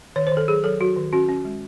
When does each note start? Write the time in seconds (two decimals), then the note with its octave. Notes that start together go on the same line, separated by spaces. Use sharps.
0.16 D#3 C#5
0.27 C5
0.32 D#3
0.37 A4
0.48 F#3 G#4
0.64 F#3 A4
0.80 F#3 F#4
0.96 D#3
1.13 C#4 F#4
1.29 C#4
1.45 G#3